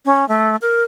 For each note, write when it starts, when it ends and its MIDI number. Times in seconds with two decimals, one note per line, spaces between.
0.05 0.27 61
0.28 0.56 57
0.61 0.84 70